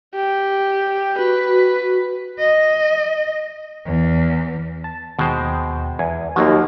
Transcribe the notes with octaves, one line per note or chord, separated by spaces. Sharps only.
G4
F#4 B4
D#5
E2
A5
D#2 B2 G#3 C5 G5
E2 G#5
D#2 F3 F#3 A#3 F#4